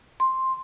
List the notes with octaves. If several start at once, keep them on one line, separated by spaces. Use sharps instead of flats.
C6